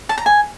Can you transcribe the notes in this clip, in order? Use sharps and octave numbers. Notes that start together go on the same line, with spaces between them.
A5
A#5
G#5